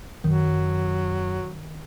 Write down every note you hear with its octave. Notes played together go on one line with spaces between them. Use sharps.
F#2 D#3 F#3